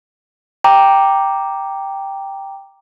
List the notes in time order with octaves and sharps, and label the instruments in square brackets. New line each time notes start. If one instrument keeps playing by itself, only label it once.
[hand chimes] G5 A#5 D6